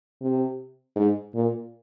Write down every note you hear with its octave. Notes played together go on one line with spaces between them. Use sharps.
C3
G#2
A#2